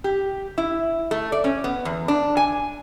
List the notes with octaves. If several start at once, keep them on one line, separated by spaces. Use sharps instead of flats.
G4
E4
A3
D5
C#4
B3
E2
D4
G#5